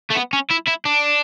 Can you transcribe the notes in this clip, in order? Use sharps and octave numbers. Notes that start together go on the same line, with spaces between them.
A3
B3
C#4
E4
E4
D4